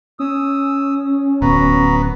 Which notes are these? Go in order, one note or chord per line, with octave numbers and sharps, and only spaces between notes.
C#4 D#6 E6
D1 B3 F#4 A#5